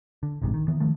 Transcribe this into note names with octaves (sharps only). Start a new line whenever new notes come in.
D3
F1 A#1 G#2 C3
D#3
D#3 E3 B3
D#3 F3 A3